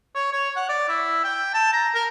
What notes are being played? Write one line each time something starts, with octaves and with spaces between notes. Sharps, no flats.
C#5
C#5
F#5
D5
E4
G5
A5
A#5
A#4